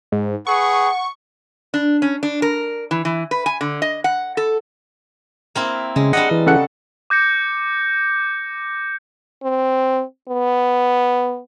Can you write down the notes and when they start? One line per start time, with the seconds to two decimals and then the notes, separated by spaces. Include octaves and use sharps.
0.12 G#2
0.47 G#4 B4 F#5 C#6
1.74 D4
2.02 C#4
2.23 D4
2.42 A#4
2.91 E3
3.05 E3
3.31 B4
3.46 G#5
3.61 D3
3.82 D#5
4.04 F#5
4.37 A4
5.55 A#3 C4 E4
5.96 C#3 G#3
6.13 G3 D4 D#5 F#5
6.31 E3
6.46 C#3 A4 F#5
7.10 D6 G6 A#6 C#7
9.43 C4
10.28 B3